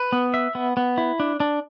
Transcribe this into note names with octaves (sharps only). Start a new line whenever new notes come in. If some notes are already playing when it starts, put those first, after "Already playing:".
Already playing: B4
B3
E5
B3
B3
E4
D4
D4